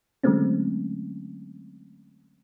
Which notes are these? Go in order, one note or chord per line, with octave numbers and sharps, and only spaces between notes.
D3 F#3 G#3 A3 C4 C#4